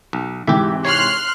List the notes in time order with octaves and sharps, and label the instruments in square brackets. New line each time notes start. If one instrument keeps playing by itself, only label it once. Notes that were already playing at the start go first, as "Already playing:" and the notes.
[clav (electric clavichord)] B1
[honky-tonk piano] G#2 C3 E3 [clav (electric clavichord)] G4 E5
[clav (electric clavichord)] C#5 [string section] C6 F6 F#6